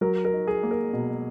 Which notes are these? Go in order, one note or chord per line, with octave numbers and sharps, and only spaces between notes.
F#3 A#4
A#4
D#4
G#4
A#3
A#4
B2